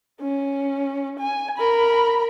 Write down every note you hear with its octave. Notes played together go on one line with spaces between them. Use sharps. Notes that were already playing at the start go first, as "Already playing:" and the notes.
C#4
G#5
A#4 B5